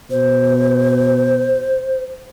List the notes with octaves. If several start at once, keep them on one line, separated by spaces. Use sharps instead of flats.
B2 C5